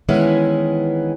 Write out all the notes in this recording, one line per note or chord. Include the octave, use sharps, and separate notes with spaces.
D#3 E3 G#3 B3 C#4 E4